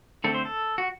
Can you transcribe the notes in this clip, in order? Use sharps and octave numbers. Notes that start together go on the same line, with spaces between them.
D3 A3 C4 A4
C5
A4
F#4